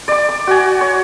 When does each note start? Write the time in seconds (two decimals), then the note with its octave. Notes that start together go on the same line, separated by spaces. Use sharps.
0.08 D5 D6
0.29 D6
0.47 F#4 G#5
0.81 C#5